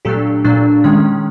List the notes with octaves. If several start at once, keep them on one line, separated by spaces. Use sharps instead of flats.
A#2 F#3 A3 D4 G4 A4
A#2 F#3 A3 D4
D#3 G#3 C#4